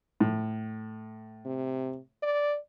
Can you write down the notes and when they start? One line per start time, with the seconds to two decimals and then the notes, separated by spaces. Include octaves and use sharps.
0.20 A2
1.45 C3
2.23 D5